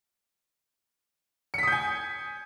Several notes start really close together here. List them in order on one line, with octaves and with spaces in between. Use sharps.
C#7 B6 D#6 G6 G#5